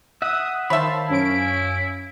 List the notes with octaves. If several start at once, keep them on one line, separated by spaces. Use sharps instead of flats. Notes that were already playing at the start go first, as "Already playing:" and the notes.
E5 F#5 D#6
D#3 C5 C#5 E5 F5 A5 B5
F#2 C#4 E4 D7